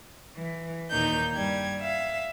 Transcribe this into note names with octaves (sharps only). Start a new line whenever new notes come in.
E3
D#2 A#2 A#3 D#4 G6
G2 G3 G#6
E5 F5